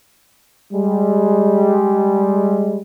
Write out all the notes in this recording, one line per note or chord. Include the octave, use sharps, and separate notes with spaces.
G3 G#3